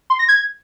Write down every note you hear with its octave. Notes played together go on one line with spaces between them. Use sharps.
C6
A#6
G#6